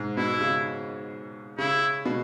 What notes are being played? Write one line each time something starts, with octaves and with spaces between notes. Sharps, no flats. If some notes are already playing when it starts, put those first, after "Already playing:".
Already playing: G#2
B2 E4
C#3
C#3 E4
B2